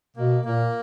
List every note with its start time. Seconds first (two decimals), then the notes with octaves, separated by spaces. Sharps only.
0.16 B2 A#3
0.45 A#2 A#3